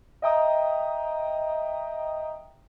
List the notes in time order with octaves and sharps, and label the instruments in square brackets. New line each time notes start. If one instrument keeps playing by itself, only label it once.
[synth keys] D#5 E5 G5 A#5 D#6